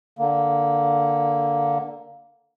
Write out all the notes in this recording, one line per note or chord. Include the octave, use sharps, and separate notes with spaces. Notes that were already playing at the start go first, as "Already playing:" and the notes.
D3 A#3